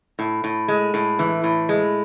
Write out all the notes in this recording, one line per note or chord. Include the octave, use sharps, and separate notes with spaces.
A2
A2
G#3
A2
E3
A2
G#3